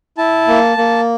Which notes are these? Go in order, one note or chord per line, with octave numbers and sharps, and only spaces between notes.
E4 A5
A#3
A#3